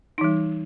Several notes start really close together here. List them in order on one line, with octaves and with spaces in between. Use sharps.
D#4 E3 G3